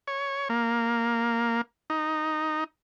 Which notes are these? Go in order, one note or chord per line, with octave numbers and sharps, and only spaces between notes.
C#5
A#3
D#4